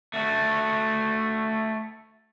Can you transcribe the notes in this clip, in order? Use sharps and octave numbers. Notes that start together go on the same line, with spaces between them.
A3 F#4